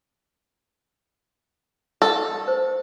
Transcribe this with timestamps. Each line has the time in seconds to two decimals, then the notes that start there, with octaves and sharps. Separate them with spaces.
2.02 A4
2.48 C5